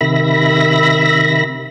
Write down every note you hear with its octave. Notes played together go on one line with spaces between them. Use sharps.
C3 D#3 E5 B5 A#6